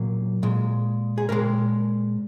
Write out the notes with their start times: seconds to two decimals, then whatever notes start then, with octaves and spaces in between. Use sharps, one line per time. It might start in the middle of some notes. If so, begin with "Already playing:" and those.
Already playing: A#2 F#3 A#3
0.43 A#2 G#3
1.18 G#4
1.29 A#2 G#3 A#4